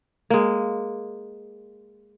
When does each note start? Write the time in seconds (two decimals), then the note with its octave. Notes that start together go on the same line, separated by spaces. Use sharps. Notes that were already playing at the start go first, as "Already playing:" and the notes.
0.30 G#3 A#3